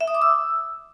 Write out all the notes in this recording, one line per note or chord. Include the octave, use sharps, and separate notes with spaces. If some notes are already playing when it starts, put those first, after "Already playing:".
E5
D#6
D6
E6